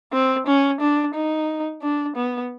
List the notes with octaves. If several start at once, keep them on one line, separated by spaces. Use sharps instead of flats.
C4
C#4
D4
D#4
D4
B3